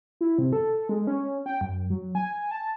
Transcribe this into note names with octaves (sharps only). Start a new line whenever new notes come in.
E4
C3
A4
G#3
C#4
G5
F#2
F#3
G#5
A5